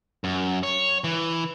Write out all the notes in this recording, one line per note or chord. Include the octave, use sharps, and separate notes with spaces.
F#2
C#5
E3